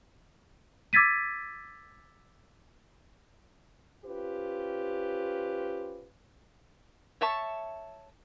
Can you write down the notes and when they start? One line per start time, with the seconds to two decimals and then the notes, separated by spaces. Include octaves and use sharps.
0.93 D6 E6 G#6 A6 B6 D#7
4.04 C#4 F4 G4 B4 C5
7.21 C#5 E5 A5 C#6